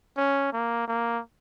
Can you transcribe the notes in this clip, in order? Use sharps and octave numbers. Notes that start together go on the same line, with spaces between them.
C#4
A#3
A#3